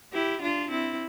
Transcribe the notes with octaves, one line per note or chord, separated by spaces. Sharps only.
E4 G4
D4 F4
C4 E4